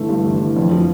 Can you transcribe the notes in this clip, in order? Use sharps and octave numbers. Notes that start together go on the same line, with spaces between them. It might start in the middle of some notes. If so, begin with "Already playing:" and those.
Already playing: G1 E3 A3
G2
G1
E3
F2
F3